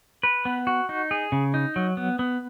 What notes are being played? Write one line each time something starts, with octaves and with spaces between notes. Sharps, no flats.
B4
B3
F#4
D#4
G#4
C#3
D#4
F#3
B3
B3